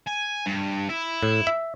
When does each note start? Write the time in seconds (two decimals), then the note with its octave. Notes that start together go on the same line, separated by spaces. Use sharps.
0.07 G#5
0.46 G2
0.89 E4
1.23 A2
1.47 E5